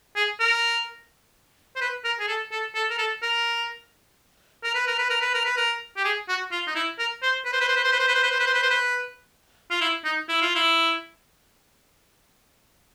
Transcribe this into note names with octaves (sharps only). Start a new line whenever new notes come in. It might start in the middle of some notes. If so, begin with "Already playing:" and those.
G#4
A#4
C5
B4
A#4
G#4
A4
A4
A4
A#4
A4
A#4
A#4
B4
A#4
B4
A#4
B4
A#4
B4
A#4
G4
G#4
F#4
F4
D#4
E4
A#4
C5
B4
C5
B4
C5
B4
C5
B4
C5
B4
C5
B4
C5
B4
C5
B4
C5
B4
F4
E4
D#4
E4
F4
E4